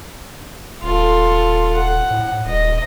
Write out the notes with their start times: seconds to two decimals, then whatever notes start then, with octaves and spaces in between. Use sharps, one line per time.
0.83 D#1 F4 A4
1.74 F#5
2.11 A2
2.45 D#1 D#5